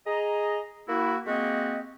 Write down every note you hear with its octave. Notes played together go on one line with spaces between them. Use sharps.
G#4 D#5 A#5
A#3 E4 F#4
G#3 A#3 C4 F#4 G4 D#5